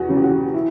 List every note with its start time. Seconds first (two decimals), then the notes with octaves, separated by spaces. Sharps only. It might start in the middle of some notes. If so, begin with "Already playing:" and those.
Already playing: E2 F#4
0.09 C#3 F#3
0.16 G4
0.24 F#4
0.54 E4